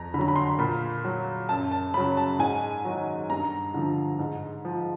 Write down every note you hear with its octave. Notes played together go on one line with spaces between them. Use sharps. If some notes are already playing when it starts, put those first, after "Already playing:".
Already playing: F2 A#5
D3 F#3 A#5 B5
B5
C6
A#2 B5
F#3
F#2 A5
A5
C#3 F#3 B5
A5
G#2 G#5
D#3 F#3
G2 A#5
D3 F3
G#2
F3